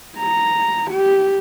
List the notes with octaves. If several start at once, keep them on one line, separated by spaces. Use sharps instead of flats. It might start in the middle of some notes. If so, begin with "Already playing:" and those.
A#5
G4